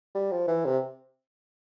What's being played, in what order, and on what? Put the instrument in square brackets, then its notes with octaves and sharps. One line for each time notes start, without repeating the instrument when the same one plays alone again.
[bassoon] G3
F3
E3
C3